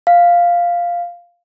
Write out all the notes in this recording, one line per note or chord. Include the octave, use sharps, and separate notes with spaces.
F5